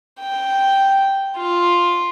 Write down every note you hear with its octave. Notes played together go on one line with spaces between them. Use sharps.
G5
F4